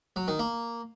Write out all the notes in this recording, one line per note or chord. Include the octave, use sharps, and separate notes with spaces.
F#3
D#3
A#3